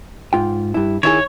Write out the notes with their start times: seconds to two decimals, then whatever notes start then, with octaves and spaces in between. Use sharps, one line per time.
0.33 G#2 F4 G5
0.74 G2 E4
1.03 D#3 E4 G#4 C#5